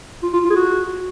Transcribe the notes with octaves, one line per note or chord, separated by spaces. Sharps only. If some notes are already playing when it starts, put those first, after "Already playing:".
F4
F4
F4
G#4
F#4